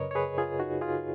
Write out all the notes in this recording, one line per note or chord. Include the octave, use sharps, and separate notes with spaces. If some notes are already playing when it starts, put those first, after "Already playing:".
Already playing: F#2 C#3 A#4 B4 C#5 D#5
C#5
G#4 B4
F4 G#4
D#4 F#4
F4 G#4